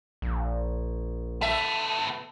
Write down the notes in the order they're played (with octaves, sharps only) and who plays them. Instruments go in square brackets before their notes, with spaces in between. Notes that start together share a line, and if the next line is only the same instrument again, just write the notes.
[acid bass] A#1
[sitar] A3 E5 [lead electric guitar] B3 A4